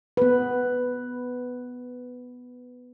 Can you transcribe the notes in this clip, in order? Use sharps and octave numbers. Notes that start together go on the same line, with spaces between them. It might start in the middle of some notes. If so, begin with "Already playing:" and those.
B3 B4